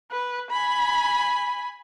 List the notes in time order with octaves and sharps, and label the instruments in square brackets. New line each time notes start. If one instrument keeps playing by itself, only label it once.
[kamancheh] B4
G#5 B5